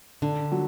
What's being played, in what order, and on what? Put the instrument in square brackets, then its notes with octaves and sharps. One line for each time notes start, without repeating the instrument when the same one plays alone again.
[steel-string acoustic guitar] D3 [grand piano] D4
[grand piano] F#3